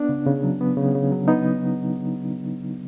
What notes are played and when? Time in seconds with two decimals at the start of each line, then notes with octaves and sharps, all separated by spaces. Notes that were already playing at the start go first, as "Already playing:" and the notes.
Already playing: B3 D4
0.09 C#3
0.26 C#3
0.43 F#3
0.61 B3
0.77 C#3
0.95 C#3
1.12 F#3
1.28 B3 D#4